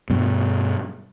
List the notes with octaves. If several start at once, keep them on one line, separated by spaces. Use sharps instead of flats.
G2 B2